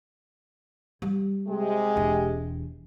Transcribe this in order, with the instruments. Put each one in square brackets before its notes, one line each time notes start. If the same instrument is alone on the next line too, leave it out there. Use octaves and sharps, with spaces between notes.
[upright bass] G3
[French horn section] C3 G#3 G4
[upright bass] E1 E2